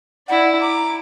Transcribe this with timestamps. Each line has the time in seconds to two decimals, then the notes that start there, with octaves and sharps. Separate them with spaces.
0.28 E4 D5 F#5
0.62 A#5 D6